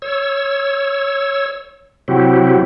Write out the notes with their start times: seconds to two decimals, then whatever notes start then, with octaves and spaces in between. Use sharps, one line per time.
0.02 C#5 E6
2.08 C3 F#3 C4 E4 F#4 G4